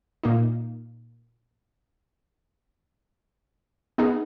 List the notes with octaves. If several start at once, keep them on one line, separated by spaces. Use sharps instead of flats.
A#2 A#3 D#4
B3 D#4 G#4